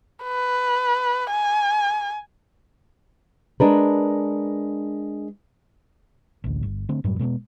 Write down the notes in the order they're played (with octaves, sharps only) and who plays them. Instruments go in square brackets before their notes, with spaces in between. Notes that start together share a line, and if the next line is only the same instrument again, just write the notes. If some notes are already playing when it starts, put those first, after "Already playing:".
[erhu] B4
G#5
[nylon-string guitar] G#3 D4 A#4 B4
[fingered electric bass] A1 D2
G1
D3 A3 C4
F#2 A2 F#3 G3
B2 G#3 A#3 B3